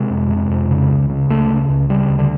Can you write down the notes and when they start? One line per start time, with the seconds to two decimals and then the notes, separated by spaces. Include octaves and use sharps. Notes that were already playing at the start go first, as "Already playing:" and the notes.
Already playing: C3 G#3
0.10 F2
0.31 C3
0.50 F2
0.71 C#3
0.90 C#2
1.09 C#3
1.30 C#2 A3
1.49 C#3
1.69 C#2
1.89 C#3 G3
2.09 D2
2.19 D3